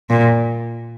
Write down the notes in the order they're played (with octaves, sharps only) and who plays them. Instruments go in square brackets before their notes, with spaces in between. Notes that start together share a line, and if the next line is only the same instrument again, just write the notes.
[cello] A#2